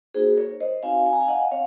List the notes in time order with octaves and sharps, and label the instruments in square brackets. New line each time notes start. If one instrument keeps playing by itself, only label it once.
[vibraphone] A#3 D#4 F#4 G#4 C5
A#4 C#5
C5 D#5
C4 D#4 F#4 F5 G#5
G#5
A#5
F5 G#5
D#5 F#5
C4 C#5 F5